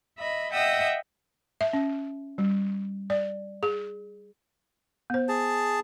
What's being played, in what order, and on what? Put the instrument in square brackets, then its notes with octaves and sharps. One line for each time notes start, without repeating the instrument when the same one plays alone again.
[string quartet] D#5 E5 B5
D#5 E5 F#5 G5 D#6 E6
[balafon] E5
C#4
G3
D5
G#4
B3 C5
[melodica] G#4 A5